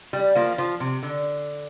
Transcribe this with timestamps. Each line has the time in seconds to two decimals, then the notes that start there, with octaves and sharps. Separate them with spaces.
0.13 G3
0.35 F3 A#3
0.58 F3
0.80 C3
1.03 D3